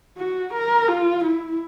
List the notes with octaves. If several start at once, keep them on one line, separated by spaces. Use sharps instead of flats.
F#4
A#4
F4
E4